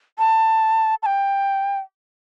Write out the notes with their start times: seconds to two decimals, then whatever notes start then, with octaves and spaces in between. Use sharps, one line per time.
0.19 A5
1.03 A5
1.06 G5